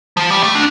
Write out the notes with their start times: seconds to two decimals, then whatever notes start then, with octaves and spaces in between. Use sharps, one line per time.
0.17 F3
0.30 G3
0.43 A3
0.55 D4